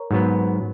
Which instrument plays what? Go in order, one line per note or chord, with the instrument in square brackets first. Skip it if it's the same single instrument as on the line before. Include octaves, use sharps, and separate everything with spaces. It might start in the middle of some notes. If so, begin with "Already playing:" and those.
Already playing: [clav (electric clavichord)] A#4 C#5
G#2 F#3 B3